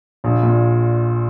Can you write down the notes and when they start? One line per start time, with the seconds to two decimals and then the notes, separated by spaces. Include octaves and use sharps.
0.24 A#1
0.43 A#2